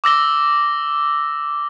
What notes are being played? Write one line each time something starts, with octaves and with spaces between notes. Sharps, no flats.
D6 E6 A#6 G7